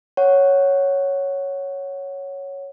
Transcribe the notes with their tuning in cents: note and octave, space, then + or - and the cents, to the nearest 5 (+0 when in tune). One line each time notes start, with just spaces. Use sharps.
C#5 +0 F#5 +0